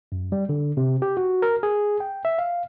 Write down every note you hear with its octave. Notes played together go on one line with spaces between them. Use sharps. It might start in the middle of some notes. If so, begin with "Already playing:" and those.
F#2
G3
D3
C3
G4
F#4
A#4
G#4
G5
E5
F5